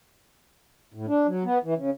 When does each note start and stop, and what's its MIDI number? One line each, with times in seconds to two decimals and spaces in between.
0.94 1.06 45
1.08 1.27 62
1.27 1.44 54
1.44 1.58 59
1.64 1.74 52
1.77 1.90 49